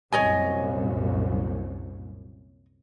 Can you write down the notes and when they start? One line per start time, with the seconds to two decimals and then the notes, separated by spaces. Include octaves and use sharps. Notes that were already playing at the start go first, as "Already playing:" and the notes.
0.12 C2 F#2 A#2 C#5 D#5 G#5